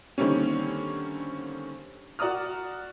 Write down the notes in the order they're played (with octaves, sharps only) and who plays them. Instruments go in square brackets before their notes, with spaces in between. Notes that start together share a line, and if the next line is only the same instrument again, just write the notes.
[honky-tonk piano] D3 D#3 G3 A#3 C4 C#4
F#4 D5 A#5 D#6 F6